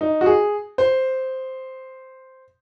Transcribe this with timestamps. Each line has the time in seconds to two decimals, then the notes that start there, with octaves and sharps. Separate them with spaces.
0.01 D#4
0.21 F#4
0.26 G#4
0.78 C5